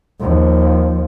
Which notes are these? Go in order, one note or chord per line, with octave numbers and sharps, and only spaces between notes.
D#2 F3